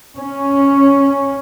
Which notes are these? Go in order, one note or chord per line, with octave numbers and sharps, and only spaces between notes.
C#4